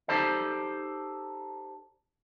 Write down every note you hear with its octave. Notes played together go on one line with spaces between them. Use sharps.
D#4 F#4 G4 A4 C5 D5